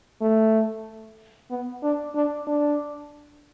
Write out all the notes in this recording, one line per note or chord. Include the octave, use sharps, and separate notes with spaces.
A3
B3
D4
D4
D4